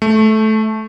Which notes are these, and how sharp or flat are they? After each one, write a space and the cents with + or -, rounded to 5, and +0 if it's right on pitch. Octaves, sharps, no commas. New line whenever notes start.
A3 -15